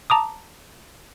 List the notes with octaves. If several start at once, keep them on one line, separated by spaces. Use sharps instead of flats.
A5 A#5 D6 D#6